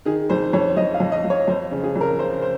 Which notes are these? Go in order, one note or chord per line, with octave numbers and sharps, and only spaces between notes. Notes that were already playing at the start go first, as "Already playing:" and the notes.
D#3 G#4
F2 C5
F2 C#5
F2 D#5
F5
F2
D#5
F2
C#5
F2 C5
C#3
G#4
F2
A#4
C#3 C5
C5